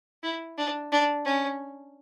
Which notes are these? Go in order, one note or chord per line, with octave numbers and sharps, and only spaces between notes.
E4
D4
D4
C#4